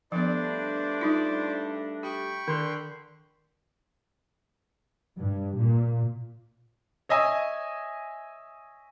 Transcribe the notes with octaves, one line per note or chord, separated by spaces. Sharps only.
G2 F3 A3 B3 D4 C5 D5
G3 D#4 F4
G4 G5 B5 C#6
D3 D#3 C6
G2
A#2
C#5 D#5 E5 G#5